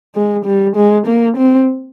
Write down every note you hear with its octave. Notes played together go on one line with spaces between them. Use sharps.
G#3
G3
G#3
A#3
C4